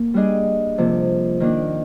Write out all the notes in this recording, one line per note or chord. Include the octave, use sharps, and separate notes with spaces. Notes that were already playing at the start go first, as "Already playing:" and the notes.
Already playing: A#3
G3 D4 G#4 D#5
C3 F3 A#3
D#3 A#3 D4